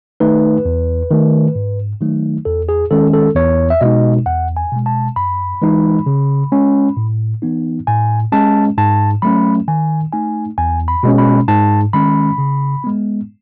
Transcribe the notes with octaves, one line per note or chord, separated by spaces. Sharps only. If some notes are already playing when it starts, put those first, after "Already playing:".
D#3 A3 D#4 B4
E2
D#3 A3
G#2
D#3 F#3 A3 D#4
E2 A4
G#4
D#3 G#3 C#4 A4
A4
E2 C#5
E5
B2 G#3 D#4 D#5
E2 F#5
G#5
B2 G#3
A5
F#2 B5
E3 G#3 D#4
C#3
G#3 C#4
A2
E3 B3 D#4
A2 G#5
G#3 C#4 A5
G#2 A5
F#3 A3 C#4 B5
D#3 G#5
A3 D#4 G#5
E2 G#5
B5
B2 G#3 C#4
B5
G#2 A5
D#3 G#3 C#4 B5
C#3
G#3 B3